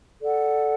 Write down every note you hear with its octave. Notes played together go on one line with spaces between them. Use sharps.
A4 D5 F#5